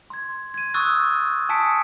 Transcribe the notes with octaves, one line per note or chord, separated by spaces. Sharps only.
C6 G#6
G#6 D#7
C#6 D#6 E6 F#6 G#6 A6
G#5 A5 D#6 B6 C#7 D7